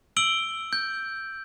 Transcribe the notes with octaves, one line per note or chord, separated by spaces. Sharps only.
E6 D7 F#7 G7
G6